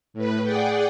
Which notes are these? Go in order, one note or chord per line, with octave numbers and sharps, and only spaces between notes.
A2 B4
G#4 D5 F#5 G5